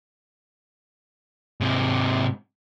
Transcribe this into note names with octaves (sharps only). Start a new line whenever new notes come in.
G#2 C3